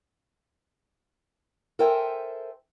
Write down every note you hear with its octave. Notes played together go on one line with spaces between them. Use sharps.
A4 A#4 C5 E5 G5 G#5